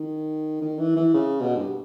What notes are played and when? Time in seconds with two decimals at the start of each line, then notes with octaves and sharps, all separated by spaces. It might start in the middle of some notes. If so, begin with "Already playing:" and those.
Already playing: D#3
0.61 D#3
0.79 E3
0.96 E3
1.14 C#3
1.41 B2
1.56 G2